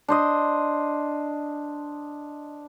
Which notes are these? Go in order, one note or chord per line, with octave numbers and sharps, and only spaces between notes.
D4 C5 D#5